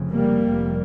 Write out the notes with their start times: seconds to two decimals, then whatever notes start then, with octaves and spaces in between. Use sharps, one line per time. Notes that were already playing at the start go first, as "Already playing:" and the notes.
Already playing: F1 F2 C#3
0.11 G3 A#3
0.43 F1 F2 C3